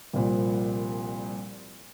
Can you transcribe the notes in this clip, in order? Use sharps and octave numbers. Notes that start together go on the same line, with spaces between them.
C2 A#2 F3